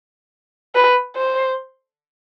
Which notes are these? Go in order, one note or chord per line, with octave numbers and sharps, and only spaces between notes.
B4
C5